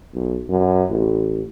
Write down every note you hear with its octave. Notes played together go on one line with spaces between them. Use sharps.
B1
F#2
A1